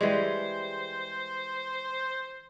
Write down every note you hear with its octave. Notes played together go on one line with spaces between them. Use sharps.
E3 G3 G#3 C5